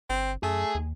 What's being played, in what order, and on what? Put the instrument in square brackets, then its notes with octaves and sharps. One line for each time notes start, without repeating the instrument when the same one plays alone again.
[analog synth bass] G1 [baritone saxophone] C4
[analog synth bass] F#2 [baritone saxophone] A3 [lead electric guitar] G#4
[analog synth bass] D#2